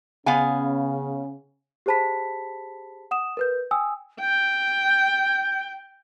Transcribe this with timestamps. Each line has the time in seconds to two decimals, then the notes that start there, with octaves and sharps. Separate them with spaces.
0.26 C#3 B3 F5 G#5
1.86 G4 G#4 C5 A5 B5 B6
3.11 F#5 D#6 E7
3.37 A#4 B4 G6
3.71 G5 G#5 D#6 E6
4.21 G5 G6